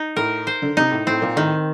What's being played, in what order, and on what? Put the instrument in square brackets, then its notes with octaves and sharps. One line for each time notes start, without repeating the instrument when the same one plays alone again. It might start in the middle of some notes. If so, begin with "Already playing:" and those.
Already playing: [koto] D#4
[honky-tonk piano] A2 [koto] A#4
[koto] C5
[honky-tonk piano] D3
[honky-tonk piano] C3 [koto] D#4
[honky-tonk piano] A2
[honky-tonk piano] A2 [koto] C4
[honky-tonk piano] A#2
[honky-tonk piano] A2 [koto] D#3